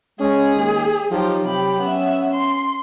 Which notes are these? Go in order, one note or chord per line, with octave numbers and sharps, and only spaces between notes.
G#3 C#4 G#4
D#2
F3 F#3 D#4 G4
C3 G4 B5
B3 C#4 E5
C6